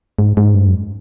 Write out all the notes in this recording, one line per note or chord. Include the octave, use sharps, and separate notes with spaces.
G#2
G#2
G2
F#2